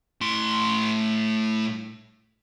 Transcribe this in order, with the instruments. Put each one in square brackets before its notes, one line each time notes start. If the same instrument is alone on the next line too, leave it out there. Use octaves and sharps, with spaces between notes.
[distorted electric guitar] A2 C6